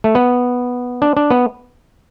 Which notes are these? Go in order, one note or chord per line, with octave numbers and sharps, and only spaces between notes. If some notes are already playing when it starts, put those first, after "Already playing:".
A3
B3
D4
D4
B3